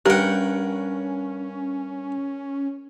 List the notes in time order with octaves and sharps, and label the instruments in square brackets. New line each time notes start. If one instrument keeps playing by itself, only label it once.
[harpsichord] G2 G5 [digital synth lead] C#4 [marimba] G4 [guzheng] A#4 F#5